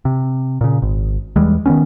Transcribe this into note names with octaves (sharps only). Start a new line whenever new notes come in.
C3
A#2 C#3
G#1
E2 E3 G3 G#3
D#3 E3 B3 C#4